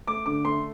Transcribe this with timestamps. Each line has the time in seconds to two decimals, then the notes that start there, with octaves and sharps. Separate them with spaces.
0.07 A3 D6
0.26 D3 D6
0.45 A3 C6